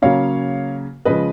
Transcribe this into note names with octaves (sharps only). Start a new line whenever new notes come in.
C#3 F#3 A#3 C#4 C#5 F5
C#3 F3 G#3 C#4 B4 D#5